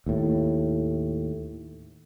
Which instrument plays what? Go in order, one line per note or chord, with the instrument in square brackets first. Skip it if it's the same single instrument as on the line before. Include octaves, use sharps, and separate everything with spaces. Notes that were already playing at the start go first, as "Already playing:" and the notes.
[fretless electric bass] D#2 A2